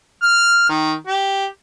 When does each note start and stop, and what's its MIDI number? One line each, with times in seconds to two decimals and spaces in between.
0.23 0.68 89
0.69 0.93 51
1.07 1.46 67